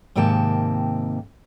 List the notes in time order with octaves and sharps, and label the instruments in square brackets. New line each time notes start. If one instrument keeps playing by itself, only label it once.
[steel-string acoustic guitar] G#2 C3 D#3 A#3 G5 A5